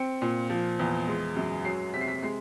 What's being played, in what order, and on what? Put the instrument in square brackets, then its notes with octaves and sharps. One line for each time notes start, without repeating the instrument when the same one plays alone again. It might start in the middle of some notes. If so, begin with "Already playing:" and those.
Already playing: [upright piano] C4 C#7
A#2
F3
E2
G#3
F#2
F#3 C7
C3 B6
C7
B6
G#3 C7